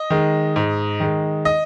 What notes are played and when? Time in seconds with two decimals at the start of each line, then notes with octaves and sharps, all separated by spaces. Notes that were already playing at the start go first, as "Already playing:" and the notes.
Already playing: D#5
0.10 D#3 G#3
0.56 G#2
1.00 D#3 G#3
1.45 D#5